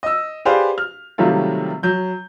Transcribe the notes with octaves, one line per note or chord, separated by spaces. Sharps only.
D#5 E6
G4 G#4 B4 C5 D5 F5
F6
C3 D#3 F#3 G3 A3 F4
F#3 G6